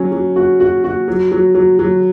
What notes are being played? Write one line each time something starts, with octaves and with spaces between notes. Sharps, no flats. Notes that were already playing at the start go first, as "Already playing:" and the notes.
Already playing: F#3 C#4
F#3
F#4
F#4
F#4
F#3
F#3
F#3
F#3